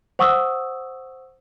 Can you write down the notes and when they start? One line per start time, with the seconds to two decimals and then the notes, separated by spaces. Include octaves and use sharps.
0.19 C5 F#5 C#6 D#6 E6